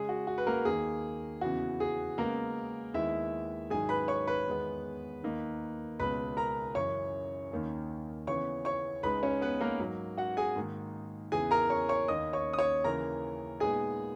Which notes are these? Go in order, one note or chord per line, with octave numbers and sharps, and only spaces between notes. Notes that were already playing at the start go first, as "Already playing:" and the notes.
Already playing: C#3 G#3 C#4 G#4
F#4
F#4
B4
A#3 A#4
D#2 D#3 A#3 G#4
E2 C#3 E3 B3 F#4
G#4
C#3 G#3 A#3 B3 A#4
D#2 D#3 G#3 B3 E4 E5
G#2 D#3 F#3 G#4 G#5
B4 B5
C#5 C#6
B4 B5
E2 D#3 G#3 B3
D#2 D#3 A#3 D#4
C#2 B2 G#3 C#4 B4 B5
A#4 A#5
F#2 C#3 E3 C#5 C#6
D#2 D#3 A#3 C#4
C#3 E3 B3 C#5 C#6
C#5 C#6
C#2 C#3 G#3 D#4 B4 B5
C#4 C#5
B3 B4
A#3 A#4
G#2 F#3 A#3
F#4 F#5
G#4 G#5
G#2 D#3 A#3 D#4
E2 C#3 E3 G#4 G#5
A#4 A#5
C#5 C#6
C#5 C#6
D#2 D#3 A#3 D#5 D#6
C#5 C#6
D#6
C#5 C#6
D#2 C#3 E3 A#4 A#5
A#2 G#3 B3 D#4 G#4 G#5